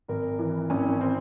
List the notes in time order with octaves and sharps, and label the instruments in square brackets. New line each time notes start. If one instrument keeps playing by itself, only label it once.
[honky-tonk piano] G#1 A#4
E3
G#1 C#4
C4